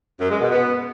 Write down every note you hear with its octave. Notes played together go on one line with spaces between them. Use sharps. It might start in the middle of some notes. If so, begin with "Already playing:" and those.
F#2
G#3
B2
B3